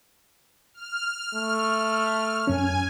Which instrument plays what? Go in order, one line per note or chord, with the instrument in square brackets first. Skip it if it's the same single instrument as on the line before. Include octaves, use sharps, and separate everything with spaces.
[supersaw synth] F6
[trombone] A3
[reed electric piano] F#2 C#4 [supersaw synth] G#5